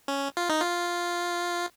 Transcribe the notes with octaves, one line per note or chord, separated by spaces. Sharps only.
C#4
F4
D#4
F4